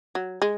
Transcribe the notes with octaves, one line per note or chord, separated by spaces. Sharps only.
F#3
G#3